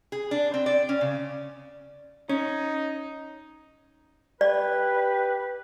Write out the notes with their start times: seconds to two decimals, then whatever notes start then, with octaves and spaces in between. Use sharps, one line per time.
0.12 G#4
0.31 D4
0.54 C4
0.66 D5
0.89 C#4
1.01 C#3
2.29 C#4 D#4
4.41 G4 B4 D5